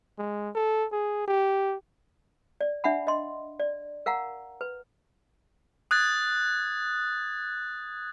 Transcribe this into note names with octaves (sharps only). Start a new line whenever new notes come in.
G#3
A4
G#4
G4
D5
D4 E5 F#5 B5
D#5 C6
D5
A#4 F5 F#5 A#5
B4
D#6 F#6 G#6 A6